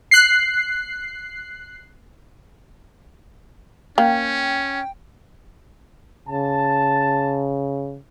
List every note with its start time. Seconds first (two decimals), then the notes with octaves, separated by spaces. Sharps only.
0.11 F#6 C7
3.98 A#3 C#4 G5
6.28 C#3 A5